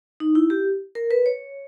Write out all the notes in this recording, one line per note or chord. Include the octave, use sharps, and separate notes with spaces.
D#4
E4
G4
A#4
B4
C#5